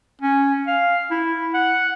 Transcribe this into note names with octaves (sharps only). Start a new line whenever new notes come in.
C#4
F5
E4
F#5